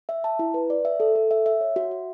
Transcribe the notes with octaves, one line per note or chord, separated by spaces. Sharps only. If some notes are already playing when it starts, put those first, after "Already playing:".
E5
A5
E4
B4
D5
E5
A4
A4
E5
E5
C#5
F#4
E5